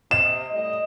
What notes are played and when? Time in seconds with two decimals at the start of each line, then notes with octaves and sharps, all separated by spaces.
0.11 C3 D#5 E7
0.53 A2 G3 D#5